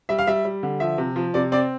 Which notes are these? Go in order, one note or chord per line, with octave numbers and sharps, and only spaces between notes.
G3 E5
F5
G3 E5
G3
D3
F3 E5
C3
F3
C3 D5
C4 D5